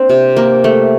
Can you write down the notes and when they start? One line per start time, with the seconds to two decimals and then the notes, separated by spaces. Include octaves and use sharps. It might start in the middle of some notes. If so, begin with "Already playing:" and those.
Already playing: A#3 C4 D4
0.09 C3
0.36 A#3
0.64 A3